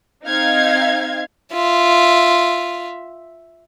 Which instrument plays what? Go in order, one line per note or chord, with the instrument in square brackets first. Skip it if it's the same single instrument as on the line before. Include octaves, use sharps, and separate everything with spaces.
[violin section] C4 D#4 F5 G#6
[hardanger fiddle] F4 E5